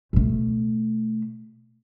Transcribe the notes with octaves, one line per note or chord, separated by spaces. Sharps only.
B2 A3